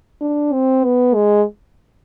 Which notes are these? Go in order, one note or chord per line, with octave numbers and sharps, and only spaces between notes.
D4
C4
B3
G#3